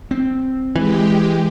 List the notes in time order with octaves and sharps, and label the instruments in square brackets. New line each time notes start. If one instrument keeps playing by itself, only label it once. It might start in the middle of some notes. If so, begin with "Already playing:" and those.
[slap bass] C4
[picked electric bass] E3 [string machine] G#3 G4